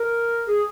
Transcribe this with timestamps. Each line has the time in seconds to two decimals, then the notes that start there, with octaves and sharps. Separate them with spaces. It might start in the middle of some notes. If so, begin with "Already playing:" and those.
Already playing: A#4
0.47 G#4